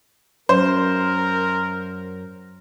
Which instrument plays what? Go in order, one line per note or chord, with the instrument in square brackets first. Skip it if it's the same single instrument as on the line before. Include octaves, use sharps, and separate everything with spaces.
[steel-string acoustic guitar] F#2 [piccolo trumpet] A#4 [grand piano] C5